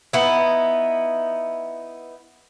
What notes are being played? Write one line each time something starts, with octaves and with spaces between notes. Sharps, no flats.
B3 D#4 E4